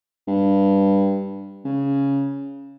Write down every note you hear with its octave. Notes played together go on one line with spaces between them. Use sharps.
G2
C#3